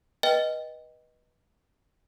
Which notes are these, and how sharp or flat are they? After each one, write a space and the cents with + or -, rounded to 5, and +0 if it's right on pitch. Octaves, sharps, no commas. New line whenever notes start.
B4 -20 D#5 +0 G5 +0